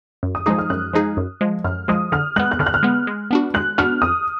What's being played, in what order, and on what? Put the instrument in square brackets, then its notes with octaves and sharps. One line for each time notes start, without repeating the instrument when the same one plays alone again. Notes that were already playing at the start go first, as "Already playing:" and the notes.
[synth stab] F#2
[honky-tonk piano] D#6
[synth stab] F3 G#3 D#4 G#4 [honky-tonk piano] D#6
[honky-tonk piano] F6
[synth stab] F#2 [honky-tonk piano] F#6
[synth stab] F3 G#3 D#4 G#4
F#2
F3 G#3
[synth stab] F#2 [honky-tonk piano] F6
[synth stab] F3 G#3 [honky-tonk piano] D#6
[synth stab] D3 [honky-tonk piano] F6
[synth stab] G#3 B3 [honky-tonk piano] F#6
[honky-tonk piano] F#6
[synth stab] D3 [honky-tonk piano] F6
[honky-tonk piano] F#6
F6
[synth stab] G#3 B3
G#3
B3 D4 F#4
[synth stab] G#3 [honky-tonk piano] F#6
[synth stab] B3 D4 F#4 [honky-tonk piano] F6
[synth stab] F2 [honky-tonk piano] D#6